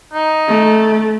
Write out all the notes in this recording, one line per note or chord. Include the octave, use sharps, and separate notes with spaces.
D#4
A3